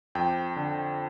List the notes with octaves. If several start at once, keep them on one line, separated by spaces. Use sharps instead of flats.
F2 G5
D3